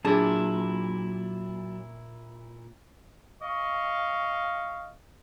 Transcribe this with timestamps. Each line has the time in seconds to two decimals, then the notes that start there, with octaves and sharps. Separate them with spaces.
0.05 A#2 F#3 D4 E4 G#4 A5
3.42 D#5 F5 C#6